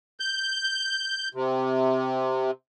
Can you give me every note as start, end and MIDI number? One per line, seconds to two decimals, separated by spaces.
0.20 1.29 91
1.34 2.51 48